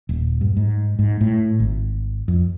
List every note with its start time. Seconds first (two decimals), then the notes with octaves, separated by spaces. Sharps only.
0.09 D#1
0.41 G2
0.57 G#2
0.99 G#2
1.21 A2
1.60 G#1
2.28 F2